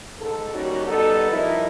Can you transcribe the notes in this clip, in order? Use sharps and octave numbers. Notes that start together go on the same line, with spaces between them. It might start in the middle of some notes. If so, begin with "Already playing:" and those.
G#2 A4
D#2 G3 C#4 D#4 F#4
G3 B3 D#4 A4
F3 G3 D#4 E4 A#4 D#5